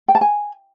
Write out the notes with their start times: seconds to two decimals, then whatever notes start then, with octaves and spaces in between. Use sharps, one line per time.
0.08 G5
0.15 A5
0.21 G#5